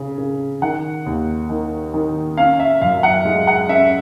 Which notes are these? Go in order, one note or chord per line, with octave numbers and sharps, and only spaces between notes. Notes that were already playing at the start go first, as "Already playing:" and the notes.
Already playing: C#3
C#3
D#3 F#5
D#2
D#3
D#3
C#4 F5
E5
F#2 F5
F#5
G#3
F#5
C#4 E5